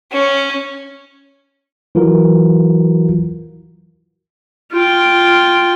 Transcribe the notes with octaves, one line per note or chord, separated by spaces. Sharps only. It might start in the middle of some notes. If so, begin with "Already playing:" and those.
C#4
E3 F#3 F4 F#4 A#4
F4 G5